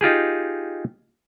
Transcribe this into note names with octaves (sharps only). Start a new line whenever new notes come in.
D#4 F4 G4 G#4